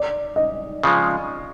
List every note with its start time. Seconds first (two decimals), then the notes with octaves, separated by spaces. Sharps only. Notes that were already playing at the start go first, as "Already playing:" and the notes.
Already playing: D5
0.36 D#5
0.83 C#3 F3 G#3